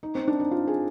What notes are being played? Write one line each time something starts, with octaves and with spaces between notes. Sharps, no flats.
D#4
C4
D4
D#4
F4
G#4